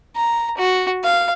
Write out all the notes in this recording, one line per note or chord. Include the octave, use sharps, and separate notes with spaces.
A#5
F#4
F5